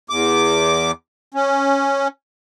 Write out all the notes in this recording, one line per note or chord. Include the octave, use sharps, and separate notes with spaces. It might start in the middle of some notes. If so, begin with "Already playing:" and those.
E2 D6
C#4